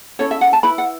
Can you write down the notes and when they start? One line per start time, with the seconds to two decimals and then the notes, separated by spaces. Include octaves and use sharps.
0.19 C#4 E4 A4 C#5
0.31 E5
0.41 F#5
0.53 A5
0.63 E4 B4 B5
0.78 F#5